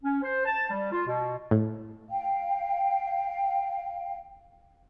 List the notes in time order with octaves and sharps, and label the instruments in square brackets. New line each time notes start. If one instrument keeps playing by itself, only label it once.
[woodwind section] C#4
C5
A5
G3
F4
B2
[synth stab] A2
[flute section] F5 G5